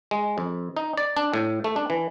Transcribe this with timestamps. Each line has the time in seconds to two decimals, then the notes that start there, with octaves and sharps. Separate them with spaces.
0.11 G#3
0.38 F2
0.77 D#4
0.97 D5
1.16 D4
1.34 A2
1.64 A3
1.76 D4
1.90 E3